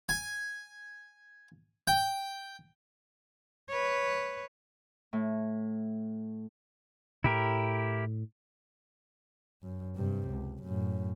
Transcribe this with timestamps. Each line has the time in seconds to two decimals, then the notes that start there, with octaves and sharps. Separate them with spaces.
0.09 G#5
1.87 G5
3.69 B4 C#5
5.13 A2
7.24 A2 E4 G4 A#4
9.63 F#2
9.96 G2 C3
10.30 C#2
10.64 F#2 A2